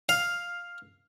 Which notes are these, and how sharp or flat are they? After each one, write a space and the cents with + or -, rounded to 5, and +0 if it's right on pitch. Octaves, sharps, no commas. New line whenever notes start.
F5 +5